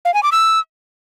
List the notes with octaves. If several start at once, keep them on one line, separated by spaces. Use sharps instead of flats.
F5
G#5
D6
E6